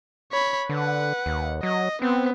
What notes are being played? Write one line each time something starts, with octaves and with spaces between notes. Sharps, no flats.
C#5 B5
D3 B4 F#5
D#2
F#3 D#5
B3 C4